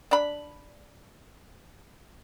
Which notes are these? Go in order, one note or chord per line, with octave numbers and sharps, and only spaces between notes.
D4 B5